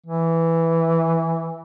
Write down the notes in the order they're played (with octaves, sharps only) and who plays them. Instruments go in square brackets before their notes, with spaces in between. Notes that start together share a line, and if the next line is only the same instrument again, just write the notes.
[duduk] E3